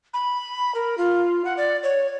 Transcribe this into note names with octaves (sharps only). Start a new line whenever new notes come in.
B5
A#4
F4
F#5
D5
C#5